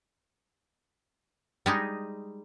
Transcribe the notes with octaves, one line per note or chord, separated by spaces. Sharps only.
G3 G#3 D#4